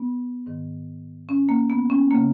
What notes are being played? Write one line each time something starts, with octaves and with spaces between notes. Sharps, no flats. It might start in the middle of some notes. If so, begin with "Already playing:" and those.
Already playing: B3
G#2 D#3
C#4
A#3
B3
C#4
C#3 A#3